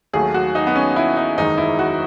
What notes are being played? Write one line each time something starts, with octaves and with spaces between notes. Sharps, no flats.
D#2 D#3 F#3 A3 G#4
F#4
D#4
B3
C#4
E4
D#4
F#1 E2 D#3 G#3 D#4
E4
F#4